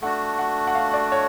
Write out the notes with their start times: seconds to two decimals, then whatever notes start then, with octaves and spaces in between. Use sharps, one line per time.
0.02 A3 D4 F#4 F#5
0.39 F#5
0.67 F#5
0.75 F5
0.94 D5
1.12 C#5